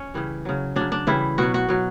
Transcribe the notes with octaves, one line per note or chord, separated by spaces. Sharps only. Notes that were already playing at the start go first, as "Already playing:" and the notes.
Already playing: C#4
C#3 E3 G3
C#3 F#3
C#3 F#3 D4
D4
C#3 E3 G3 E4
B2 F#3 F#4
F#4
B2 F#3